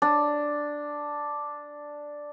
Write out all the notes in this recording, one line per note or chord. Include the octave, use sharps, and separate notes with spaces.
D4